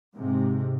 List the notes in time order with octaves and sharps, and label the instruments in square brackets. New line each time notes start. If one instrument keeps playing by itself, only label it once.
[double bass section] G#2 C3